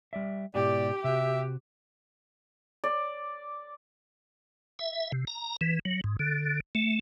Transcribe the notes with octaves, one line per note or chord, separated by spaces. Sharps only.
G3 D5 E5
G#2 B2 E4 G4 D5
C3 F#4 E5
D5
E5
C3
A#5
E3
F#3
G#2
D3
A3